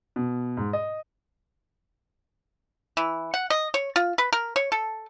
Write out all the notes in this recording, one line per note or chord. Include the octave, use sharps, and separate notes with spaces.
B2
G#2
D#5
E3
F#5
D#5
C#5
F4
B4
A#4
C#5
A4